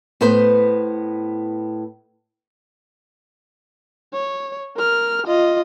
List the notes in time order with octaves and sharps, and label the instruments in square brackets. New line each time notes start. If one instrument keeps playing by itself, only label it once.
[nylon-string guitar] A2 B3 B4 C5
[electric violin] C#5
A#4 F6
F4 D#5